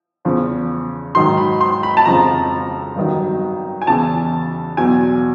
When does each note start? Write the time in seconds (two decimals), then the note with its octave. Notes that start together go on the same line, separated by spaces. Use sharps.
0.25 E2 C#3 F3
1.15 G#2 D#3 F#3 C6
1.37 B5
1.61 C6
1.83 B5
1.97 A5
2.05 F2 C#3 F3 A#5
2.96 G2 D#3 F#3
3.82 G#5
3.87 E2 C#3 E3 A5
4.77 E2 B2 F#3 G#5